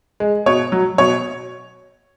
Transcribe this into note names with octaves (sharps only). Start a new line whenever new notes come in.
G#3
B2 C#5
F#3
B2 C#5